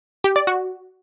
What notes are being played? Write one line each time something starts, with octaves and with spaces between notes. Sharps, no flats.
G4
D5
F#4